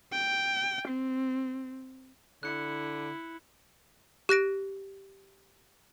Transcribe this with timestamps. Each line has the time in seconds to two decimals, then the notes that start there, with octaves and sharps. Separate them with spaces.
0.12 G5
0.88 C4
2.43 D3 E4 F#6 C#7
4.29 G4 F#6 A#6 D7